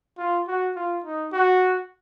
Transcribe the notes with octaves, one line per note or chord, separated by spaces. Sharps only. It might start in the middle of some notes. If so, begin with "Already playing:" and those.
F4
F#4
F4
D#4
F#4